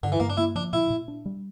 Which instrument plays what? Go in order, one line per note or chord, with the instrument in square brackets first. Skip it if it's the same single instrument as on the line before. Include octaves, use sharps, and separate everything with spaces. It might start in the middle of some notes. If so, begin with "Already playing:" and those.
[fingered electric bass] G2 [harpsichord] D3
[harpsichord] E3
[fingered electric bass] G2 [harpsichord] A#3
[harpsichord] D4
[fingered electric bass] A#3 [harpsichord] E4
[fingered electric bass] F3 [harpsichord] D4
[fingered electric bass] A#2 [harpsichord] E4
[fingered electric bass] A#2
D4
G3